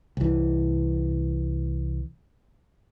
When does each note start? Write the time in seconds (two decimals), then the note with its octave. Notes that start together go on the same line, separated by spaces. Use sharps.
0.17 C2 E3